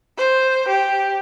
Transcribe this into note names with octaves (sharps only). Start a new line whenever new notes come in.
C5
G4